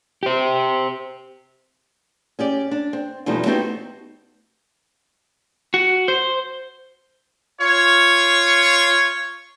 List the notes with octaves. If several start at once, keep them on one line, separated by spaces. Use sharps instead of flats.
G4 C5
C#4 G4 D5
D4
C4
E2 B2 F3 G3 A3 D#4
A3 B3 C4 D#4 F#4 G4
F#4
C5
F4 C#5